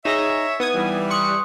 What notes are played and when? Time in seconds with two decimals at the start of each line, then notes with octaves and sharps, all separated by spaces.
0.05 D#4 G#4 C#5 E5 A#6
0.60 B3 D#4 D#6 G#6
0.75 E3 G3
1.10 C6 C#6 D#6 F#6 C#7